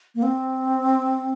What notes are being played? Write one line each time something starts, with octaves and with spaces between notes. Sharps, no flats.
A#3
C4